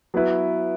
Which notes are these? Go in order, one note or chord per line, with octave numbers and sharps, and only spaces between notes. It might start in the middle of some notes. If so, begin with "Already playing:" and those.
F#3 B3 E4 B4